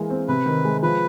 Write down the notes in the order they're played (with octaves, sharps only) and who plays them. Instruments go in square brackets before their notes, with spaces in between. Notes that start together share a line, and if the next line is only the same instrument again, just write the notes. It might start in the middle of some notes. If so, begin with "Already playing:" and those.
Already playing: [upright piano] E3 G#3 A#3
C4
[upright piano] C3 [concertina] B4
[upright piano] D#3
G#3
[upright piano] F3 [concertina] B4